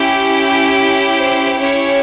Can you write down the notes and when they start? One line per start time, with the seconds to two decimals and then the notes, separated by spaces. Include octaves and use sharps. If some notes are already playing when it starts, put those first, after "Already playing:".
Already playing: C#4 E4 G4
1.18 C5
1.60 C#4 E4 G4 C#5